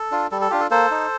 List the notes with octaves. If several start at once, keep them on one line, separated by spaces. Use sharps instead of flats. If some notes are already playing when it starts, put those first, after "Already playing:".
Already playing: A4
D4 F4
G3 A4
A4
D4 F4 G4
A4
A#3 A4 C5
D#4